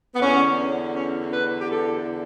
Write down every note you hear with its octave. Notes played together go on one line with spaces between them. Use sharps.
B3
E2 D3 C#4
C#4
B4
G4
A4